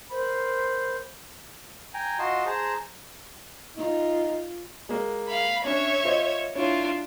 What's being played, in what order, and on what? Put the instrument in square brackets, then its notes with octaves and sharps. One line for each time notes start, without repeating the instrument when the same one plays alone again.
[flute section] A#4 C5 B5
[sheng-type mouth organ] G5 G#5 A#5
F4 F#4 D#5 A5 C6
G#4 C5 A5 A#5
[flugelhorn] D#4 [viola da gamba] F4
[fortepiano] G#3 A#3
[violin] F5 B5
[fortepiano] C#4 D4 [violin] C#5 E5
[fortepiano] F4 C5 D#5
[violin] D4 F4 [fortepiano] E4 C#5